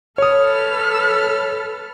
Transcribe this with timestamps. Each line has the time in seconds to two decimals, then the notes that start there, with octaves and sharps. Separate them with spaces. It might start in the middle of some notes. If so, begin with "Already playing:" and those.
0.18 A4 B4 C#5 D#6 F6